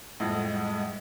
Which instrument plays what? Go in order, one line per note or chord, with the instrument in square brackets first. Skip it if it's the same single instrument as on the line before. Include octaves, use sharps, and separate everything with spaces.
[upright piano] F2 A2 [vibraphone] G3 F#5 [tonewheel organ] G#3 D#5